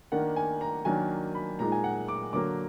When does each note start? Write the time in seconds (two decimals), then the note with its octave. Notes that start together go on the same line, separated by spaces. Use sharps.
0.12 D#3 A#3 D4 F#5
0.36 G#5
0.61 A#5
0.85 D#3 F#3 A#3 D4 G#5
1.35 B5
1.59 A#2 G#3 D#4 A#5
1.72 G#5
1.84 F#5
2.08 D6
2.33 D3 F#3 A#3 D6